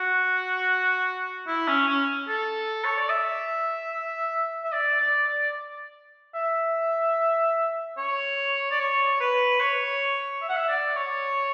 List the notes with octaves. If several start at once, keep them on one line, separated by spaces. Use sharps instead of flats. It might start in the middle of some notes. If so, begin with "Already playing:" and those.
Already playing: F#4
E4
C#4
C#4
A4
C#5
D5
E5
E5
D5
D5
D5
E5
C#5
D5
C#5
B4
C#5
E5
F#5
E5
D5
C#5